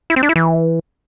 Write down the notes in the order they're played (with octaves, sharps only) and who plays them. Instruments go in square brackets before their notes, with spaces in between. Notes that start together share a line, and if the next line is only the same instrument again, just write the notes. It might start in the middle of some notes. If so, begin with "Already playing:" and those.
[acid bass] E4
C4
D4
E4
E3